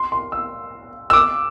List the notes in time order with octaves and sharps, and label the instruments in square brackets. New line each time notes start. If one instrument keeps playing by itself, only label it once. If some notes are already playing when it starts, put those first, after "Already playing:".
Already playing: [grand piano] C6
C6
E6
E6
D6